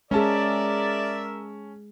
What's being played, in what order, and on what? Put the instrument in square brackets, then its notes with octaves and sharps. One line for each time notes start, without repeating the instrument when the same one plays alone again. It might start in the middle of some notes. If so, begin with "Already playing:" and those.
[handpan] G#3 G#4 [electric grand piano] C#4 A5 [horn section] A#4 E5 [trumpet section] D5